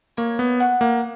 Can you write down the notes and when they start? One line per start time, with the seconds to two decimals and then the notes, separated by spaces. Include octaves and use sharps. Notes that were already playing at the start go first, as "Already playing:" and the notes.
0.17 A#3 C#5
0.39 B3
0.60 F#5 C#6
0.81 A#3